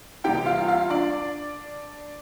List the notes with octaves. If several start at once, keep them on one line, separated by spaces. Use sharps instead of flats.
E2 C3 E3 G3 G4 G5
F4 F5
F4 F5
D4 D5